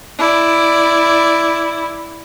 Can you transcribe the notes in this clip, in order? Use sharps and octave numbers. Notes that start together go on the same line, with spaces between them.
E4 D5